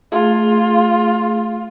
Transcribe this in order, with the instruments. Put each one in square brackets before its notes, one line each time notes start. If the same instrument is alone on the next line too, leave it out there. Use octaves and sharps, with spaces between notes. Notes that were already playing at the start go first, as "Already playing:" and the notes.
[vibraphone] A3 G#4 [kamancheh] F4